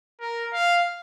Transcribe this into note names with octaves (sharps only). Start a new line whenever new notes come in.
A#4
F5